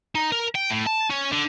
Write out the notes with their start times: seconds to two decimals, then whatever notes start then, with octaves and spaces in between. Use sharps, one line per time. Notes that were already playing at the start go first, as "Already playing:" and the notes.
0.15 D#4
0.32 A#4
0.55 G5
0.70 A2
0.86 A5
1.10 C#4
1.32 D3